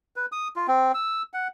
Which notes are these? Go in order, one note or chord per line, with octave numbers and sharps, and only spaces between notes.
B4
D#6
F4
C4
E6
F#5